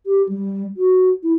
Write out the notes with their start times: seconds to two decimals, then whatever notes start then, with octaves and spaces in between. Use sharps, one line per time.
0.06 G4
0.29 G3
0.77 F#4
1.23 E4